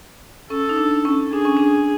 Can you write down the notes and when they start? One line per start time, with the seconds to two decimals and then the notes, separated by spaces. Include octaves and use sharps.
0.50 C#4 A4
0.69 D#4
0.78 D4
1.05 C#4
1.33 D4 G#4
1.45 C#4
1.57 D4